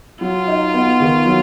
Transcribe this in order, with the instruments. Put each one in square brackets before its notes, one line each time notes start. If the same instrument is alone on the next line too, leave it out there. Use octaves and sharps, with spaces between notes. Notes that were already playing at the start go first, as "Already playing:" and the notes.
[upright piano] F#3 [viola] F4
[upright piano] D#4
B3
D#3
F#3